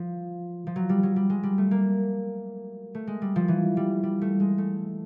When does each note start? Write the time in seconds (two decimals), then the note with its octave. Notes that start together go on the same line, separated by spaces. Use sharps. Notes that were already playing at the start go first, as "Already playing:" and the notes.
Already playing: F3
0.67 F3
0.76 F#3
0.89 G3
1.03 F#3
1.16 G3
1.30 G#3
1.43 G3
1.58 A3
1.71 A#3
2.95 A3
3.07 G#3
3.22 G3
3.36 F3
3.48 E3
3.77 G3
4.03 G3
4.21 A3
4.40 G#3
4.58 A3